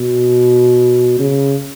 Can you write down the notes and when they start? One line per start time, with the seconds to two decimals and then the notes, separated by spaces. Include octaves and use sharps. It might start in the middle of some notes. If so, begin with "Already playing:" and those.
Already playing: B2
1.19 C#3